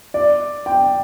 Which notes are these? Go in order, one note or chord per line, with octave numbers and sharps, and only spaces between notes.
D5
G5